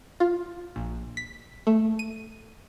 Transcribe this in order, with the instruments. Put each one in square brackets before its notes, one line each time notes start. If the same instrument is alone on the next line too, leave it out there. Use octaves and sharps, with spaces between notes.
[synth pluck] F4
A#1
B6
A3
D#7